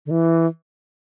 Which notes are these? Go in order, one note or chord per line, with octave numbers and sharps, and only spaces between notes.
D3
E3